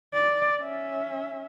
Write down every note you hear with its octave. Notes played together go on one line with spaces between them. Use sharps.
D5
C#4 E5